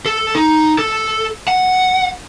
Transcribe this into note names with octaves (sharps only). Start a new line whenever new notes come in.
A4
D#4
A4
F#5